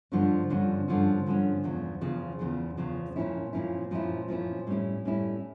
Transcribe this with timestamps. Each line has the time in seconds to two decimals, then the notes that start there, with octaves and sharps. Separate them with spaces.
0.12 G2 D3 F3 C#4
0.50 G2 D3 F3 C#4
0.88 G2 D3 F3 C#4
1.26 G2 D3 F3 C#4
1.64 E2 C#3 F3
2.01 E2 C#3 F3
2.39 E2 C#3 F3
2.77 E2 C#3 F3
3.16 A#2 F3 C#4 E4
3.53 A#2 F3 C#4 E4
3.91 A#2 F3 C#4 E4
4.28 A#2 F3 C#4 E4
4.67 A2 G3 C#4 E4
5.05 A2 G3 C#4 E4